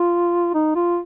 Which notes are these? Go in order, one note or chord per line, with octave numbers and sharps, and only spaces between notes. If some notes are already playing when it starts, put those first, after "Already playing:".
Already playing: F4
D#4
F4